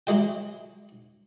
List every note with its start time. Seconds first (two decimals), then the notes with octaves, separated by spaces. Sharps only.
0.07 E3 F#3 G#3 G5